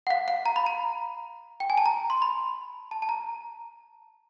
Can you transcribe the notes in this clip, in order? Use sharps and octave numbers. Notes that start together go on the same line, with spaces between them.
F#5
F5
F5
A#5
B5
A#5
G5
G#5
A5
A#5
C6
B5
A5
A5
A#5